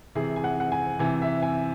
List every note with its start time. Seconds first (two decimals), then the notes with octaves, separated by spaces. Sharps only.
0.15 C3 E3 G#4
0.36 G#5
0.44 F#5
0.60 F#5
0.72 G#5
0.99 C3 E3 G#5
1.22 E5
1.42 G#5